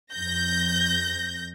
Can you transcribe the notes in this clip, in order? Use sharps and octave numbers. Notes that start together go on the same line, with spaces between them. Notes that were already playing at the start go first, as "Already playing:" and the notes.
F2 G6 A#6